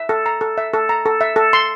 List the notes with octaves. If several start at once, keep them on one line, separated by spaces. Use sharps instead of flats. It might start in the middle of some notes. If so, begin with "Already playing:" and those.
Already playing: E5
A4
A#5
A4
E5
A4
A#5
A4
E5
A4
C6